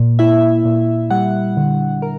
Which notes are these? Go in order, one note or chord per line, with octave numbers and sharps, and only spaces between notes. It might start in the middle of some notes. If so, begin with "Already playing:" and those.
Already playing: A#2 A#3
E4 E5
A#2
G3 F#5
D3
A#4